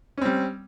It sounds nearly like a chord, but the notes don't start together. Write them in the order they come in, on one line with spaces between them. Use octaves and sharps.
C#4 C4 G3